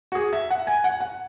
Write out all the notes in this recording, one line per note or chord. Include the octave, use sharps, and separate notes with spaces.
F#4
G#4
E5
F#5
G#5
F#5
F#5